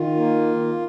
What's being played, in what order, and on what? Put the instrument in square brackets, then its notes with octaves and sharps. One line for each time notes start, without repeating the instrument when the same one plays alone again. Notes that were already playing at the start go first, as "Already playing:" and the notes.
Already playing: [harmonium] D#3 F4
A#3